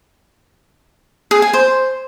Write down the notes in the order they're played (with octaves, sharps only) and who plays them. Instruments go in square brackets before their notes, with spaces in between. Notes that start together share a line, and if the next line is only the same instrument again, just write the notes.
[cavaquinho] G#4
G#5
C5